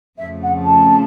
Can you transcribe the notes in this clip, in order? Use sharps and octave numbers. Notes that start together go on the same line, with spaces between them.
F2 C#3 F3 A3 E5
F#5
A5